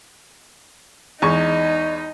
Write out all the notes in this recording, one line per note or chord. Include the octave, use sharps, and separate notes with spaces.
E2 G#3 D#4 C#6